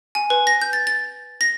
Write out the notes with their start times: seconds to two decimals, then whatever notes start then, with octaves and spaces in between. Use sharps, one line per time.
0.15 G#5
0.30 B4
0.47 A#6
0.62 G6
0.73 A6
0.87 A6
1.41 A#6